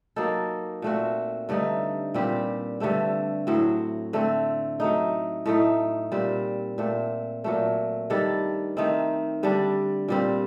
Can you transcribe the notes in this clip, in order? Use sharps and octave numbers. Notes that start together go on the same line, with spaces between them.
F#3 A#3 D#4 A4
A#2 A3 C4 F#4
G2 D3 A3 D#4
A#2 G3 C4 G4
G2 D3 A3 C4
A2 F#3 C4
D3 A3 C4
F#3 A3 D#4
A2 A3 D#4
A#2 G3 C4
A#2 A3 C4
A#2 F#3 A3
D#3 G3 D4 A4
D#3 A3 C4 D#4
D3 G3 D4
A#2 G3 C4